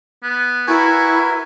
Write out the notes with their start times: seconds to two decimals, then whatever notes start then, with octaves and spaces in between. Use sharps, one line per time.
0.24 B3
0.68 E4 F#4 A#4 B4 G#5